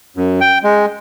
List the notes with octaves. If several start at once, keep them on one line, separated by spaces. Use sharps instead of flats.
F#2
G5
G#3